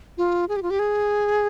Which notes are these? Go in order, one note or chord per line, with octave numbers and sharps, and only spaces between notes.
F4
G#4
G4
F4
G4
G#4